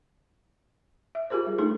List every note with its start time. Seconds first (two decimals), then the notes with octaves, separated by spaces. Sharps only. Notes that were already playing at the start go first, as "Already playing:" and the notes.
1.15 E5
1.30 F4 G4 G#4 A#4 C5
1.47 G3
1.59 A3 D4 D#4 G#4 A4